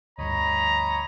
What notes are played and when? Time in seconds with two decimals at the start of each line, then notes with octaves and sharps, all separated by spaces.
0.19 D2 G2 C#5 D#5 A#5 B5